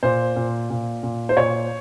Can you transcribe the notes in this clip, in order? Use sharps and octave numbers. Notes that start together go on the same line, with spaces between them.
A#2 C5
A#2
A#2
A#2
C5
A#2 C#5